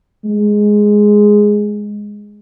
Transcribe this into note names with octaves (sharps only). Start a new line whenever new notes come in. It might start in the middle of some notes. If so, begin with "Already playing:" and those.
G#3